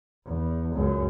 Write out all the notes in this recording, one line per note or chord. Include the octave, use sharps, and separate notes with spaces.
E2
C#2 F#2